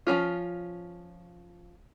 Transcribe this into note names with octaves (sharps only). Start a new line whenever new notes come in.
F3 F#3 C#4 F4